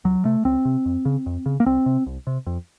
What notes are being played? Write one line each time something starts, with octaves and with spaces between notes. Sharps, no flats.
C#2 F#3
C3 A3
C#2 C4
C3
F2
C#3
F2
C#3
A#3
C2 C4
C3
C2
C3
F2